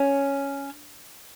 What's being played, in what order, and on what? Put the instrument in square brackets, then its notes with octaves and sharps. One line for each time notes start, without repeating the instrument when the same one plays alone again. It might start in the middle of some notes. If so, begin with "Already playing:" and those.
Already playing: [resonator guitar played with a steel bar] C#4